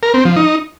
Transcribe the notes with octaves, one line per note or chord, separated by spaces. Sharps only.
A#4
C4
F3
D#4